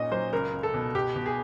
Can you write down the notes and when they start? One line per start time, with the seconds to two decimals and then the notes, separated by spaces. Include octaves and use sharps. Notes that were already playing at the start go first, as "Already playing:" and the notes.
Already playing: A#2 C#4 D#5
0.11 F#3 C5
0.33 C#2 A#4
0.53 C#2
0.63 A4
0.74 B2
0.95 B2 G4
1.16 B2
1.26 G#4